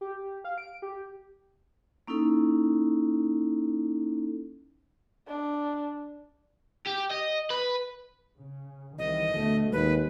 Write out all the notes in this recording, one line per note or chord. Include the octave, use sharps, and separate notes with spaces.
G4
F5
D7
G4
A#3 C#4 D#4 E4 A4
D4
G4
D#5
B4
C#3
C2 D#3 E3 D#5
D2 B2 A3
D#2 G#3 B4